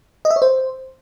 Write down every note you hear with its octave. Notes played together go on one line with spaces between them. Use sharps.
D#5
E5
C#5
C5